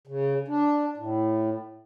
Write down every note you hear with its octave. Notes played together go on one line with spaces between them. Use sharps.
C#3
D4
A2